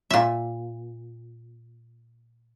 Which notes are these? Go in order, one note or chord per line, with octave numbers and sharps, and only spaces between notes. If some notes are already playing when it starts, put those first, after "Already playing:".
A#2 E5